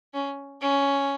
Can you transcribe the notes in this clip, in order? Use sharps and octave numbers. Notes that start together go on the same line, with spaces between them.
C#4
C#4